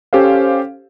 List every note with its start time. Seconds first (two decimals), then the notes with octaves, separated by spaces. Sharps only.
0.13 C#4 G4 A4 C5 F5